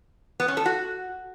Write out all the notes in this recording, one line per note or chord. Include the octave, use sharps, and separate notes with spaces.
B3
C#4
A4
F#4